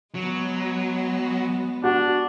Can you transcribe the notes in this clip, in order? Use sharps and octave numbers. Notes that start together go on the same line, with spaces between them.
F#3 G#3 B3
D4 F#4